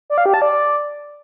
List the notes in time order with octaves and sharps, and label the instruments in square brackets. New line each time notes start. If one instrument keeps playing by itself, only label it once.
[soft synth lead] D5
F5
G4
A5
D5